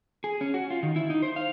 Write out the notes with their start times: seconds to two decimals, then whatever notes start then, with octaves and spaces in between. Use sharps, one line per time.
0.24 G#4
0.41 C#4
0.54 F#4
0.70 F4
0.83 D#3
0.96 E4
1.10 D#4
1.22 C5
1.36 F5